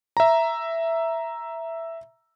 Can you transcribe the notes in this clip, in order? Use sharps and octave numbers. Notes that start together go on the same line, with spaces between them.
E5 A#5